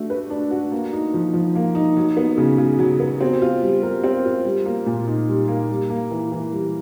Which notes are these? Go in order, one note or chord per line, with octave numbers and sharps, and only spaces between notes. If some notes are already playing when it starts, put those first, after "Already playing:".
Already playing: A3 D4 F#4
B4
D4
F#4
A#3
D#4
F3
F3
A#3
D#4
F#3
B3
C#3
C#3
F#3
B3
C4
F4
G3
A#4
C4
F4
G3
A#3
A#2
D#4
G3
A#3
G3
A#3
E3
E3
G3